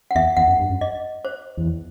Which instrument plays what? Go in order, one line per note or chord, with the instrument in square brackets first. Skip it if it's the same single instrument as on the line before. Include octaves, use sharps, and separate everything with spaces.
[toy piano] F#5
[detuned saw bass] E2 [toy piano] E5
[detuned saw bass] E2 [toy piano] F#5
[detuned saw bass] F#2
G2
F#2
[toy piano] D#5
C5
[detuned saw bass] E2